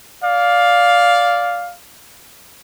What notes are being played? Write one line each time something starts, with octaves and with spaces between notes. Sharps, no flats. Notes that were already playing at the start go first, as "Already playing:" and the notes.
D5 F5